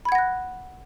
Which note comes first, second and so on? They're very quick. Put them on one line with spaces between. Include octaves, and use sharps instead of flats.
B5 G#6 F#5 A#6 F#6